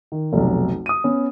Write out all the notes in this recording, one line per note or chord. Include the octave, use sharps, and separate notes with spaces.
D#3
F1 B1
D#6 D#7
B3 C#4